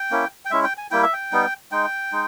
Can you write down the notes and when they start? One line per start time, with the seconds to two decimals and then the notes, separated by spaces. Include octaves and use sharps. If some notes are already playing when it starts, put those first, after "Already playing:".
Already playing: G5
0.11 A#3 C#4 E4
0.45 G5
0.51 G#3 C#4 E4 E5
0.64 G5
0.78 G#5
0.91 G3 A#3 E4 G5
1.03 E5
1.13 G5
1.32 G3 B3 D#4
1.72 G#3 D#4 G5
2.12 G#3 D#4